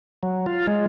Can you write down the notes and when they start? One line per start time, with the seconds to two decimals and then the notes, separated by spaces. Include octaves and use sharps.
0.23 F#3
0.46 F4
0.67 G#3